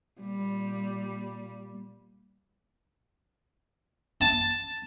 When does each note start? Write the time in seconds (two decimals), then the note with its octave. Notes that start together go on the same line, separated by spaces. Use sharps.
0.21 A#2 G3
4.21 A5